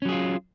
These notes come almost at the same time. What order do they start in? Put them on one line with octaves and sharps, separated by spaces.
C#4 F#3 G#4 F4